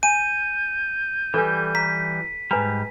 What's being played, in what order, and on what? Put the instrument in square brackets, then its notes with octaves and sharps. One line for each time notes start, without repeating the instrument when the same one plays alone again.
[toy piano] G#5 [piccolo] G6 [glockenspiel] D#7
[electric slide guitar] E3 G3 [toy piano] A4 B4 G#5
[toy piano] A#5 [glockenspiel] B6
[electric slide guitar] G#2 G3 [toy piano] B4 G#5 A#5